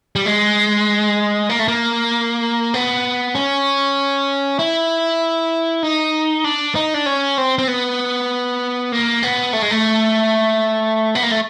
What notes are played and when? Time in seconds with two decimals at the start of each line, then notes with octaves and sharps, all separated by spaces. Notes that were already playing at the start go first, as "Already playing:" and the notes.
0.16 G3
0.26 G#3
1.50 A#3
1.59 A3
1.68 A#3
2.74 B3
3.35 C#4
4.59 E4
5.83 D#4
6.44 D4
6.75 D#4
6.94 D4
7.06 C#4
7.38 C4
7.58 C4
7.68 B3
8.92 A#3
9.23 B3
9.53 A3
9.62 G#3
9.71 A3
11.15 B3
11.23 A#3
11.31 A3